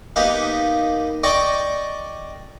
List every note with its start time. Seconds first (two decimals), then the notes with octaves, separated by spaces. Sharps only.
0.16 A#3 B3 D#4 G4 F5
1.23 D5 D#5 G5 C#6 D6